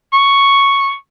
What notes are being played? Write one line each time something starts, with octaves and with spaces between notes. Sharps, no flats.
C#6